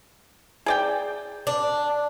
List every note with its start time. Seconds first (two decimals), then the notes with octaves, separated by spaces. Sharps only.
0.66 G#4 D5 G5
1.47 D4